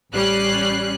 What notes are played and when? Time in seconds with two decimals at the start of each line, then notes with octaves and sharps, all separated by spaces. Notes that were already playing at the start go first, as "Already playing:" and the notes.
0.13 A1 G3 C#4 F#6 C7